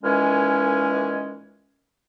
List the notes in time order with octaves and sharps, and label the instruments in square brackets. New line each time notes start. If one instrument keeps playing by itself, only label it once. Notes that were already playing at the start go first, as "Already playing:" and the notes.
[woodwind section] A#2 D#3 E3 G#3 C#4